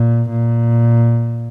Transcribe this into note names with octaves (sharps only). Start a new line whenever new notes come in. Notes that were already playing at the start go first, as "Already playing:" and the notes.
Already playing: A#2
A#2